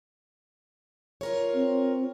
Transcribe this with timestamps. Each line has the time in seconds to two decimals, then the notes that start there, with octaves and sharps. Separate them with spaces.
1.21 F4 A#4 C#5
1.54 C4